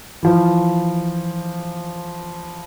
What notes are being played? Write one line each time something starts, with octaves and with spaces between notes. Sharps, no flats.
E3 F3